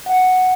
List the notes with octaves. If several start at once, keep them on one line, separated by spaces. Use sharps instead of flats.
F#5